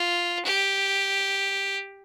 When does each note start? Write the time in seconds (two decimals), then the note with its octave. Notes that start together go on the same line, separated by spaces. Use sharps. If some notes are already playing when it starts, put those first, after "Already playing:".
Already playing: F4
0.45 G4